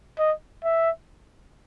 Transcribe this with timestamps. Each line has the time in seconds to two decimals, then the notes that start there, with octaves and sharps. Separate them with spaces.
0.19 D#5
0.64 E5